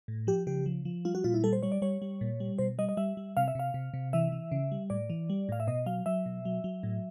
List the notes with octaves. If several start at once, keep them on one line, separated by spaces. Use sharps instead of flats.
A2
F3 G4
C#3 G4
F3
F3
G3 F4
F#4
A#2 F4
E4
G3 A4
C5
G3 C#5
D5
G3 C#5
G3
A#2
G3
B2 C5
G3 D#5
D#5
G3 E5
G3
C3 F5
E5
C3 F5
C3
C3
E3 E5
E3
C#3
G3
A2 D5
E3
G3
A2 F5
E5
B2 D#5
F#3 F5
F#3 E5
B2
F#3
F#3
A2